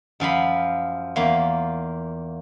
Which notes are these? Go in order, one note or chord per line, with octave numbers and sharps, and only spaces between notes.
F#2 F3 F4 B5
E2 A#3 F4